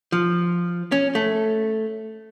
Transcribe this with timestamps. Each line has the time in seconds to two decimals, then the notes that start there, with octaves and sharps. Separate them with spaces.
0.12 F3
0.92 C#4
1.15 A3